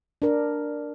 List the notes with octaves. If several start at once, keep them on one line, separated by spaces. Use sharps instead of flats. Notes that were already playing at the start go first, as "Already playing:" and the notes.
D4 A#4